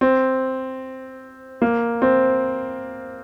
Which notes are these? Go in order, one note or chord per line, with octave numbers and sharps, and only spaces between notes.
C4
A#3
C4